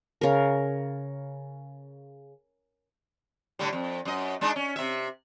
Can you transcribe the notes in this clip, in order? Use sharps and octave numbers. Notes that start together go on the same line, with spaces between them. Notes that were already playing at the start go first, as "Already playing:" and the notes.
C#3 A#4
A2 D3 G3
F2
F#2 D#5
G#3 D4 D#4
C#4
C3 E5